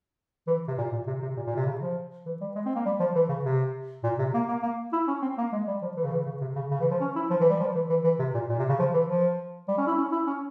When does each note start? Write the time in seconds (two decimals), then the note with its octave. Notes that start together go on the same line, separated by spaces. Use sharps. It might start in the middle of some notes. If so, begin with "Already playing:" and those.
0.47 E3
0.68 C3
0.78 A#2
0.92 A#2
1.07 C3
1.22 C3
1.36 A#2
1.47 A#2
1.56 C3
1.65 C#3
1.81 F3
2.26 E3
2.41 G3
2.55 G#3
2.65 C4
2.75 A#3
2.85 G3
3.00 F3
3.15 E3
3.29 C#3
3.44 C3
4.03 A#2
4.18 C3
4.34 A#3
4.48 A#3
4.62 A#3
4.92 E4
5.07 C#4
5.22 C4
5.38 A#3
5.52 G#3
5.67 G3
5.81 F3
5.96 E3
6.04 C#3
6.12 E3
6.25 C#3
6.41 C3
6.55 C#3
6.71 C#3
6.80 E3
6.91 F3
7.00 C#4
7.15 E4
7.30 F3
7.40 E3
7.50 G3
7.59 F3
7.75 E3
7.89 E3
8.04 E3
8.19 C3
8.34 A#2
8.49 A#2
8.59 C3
8.69 C#3
8.79 F3
8.94 E3
9.08 F3
9.68 G3
9.77 C#4
9.87 E4
9.97 C#4
10.12 E4
10.27 C#4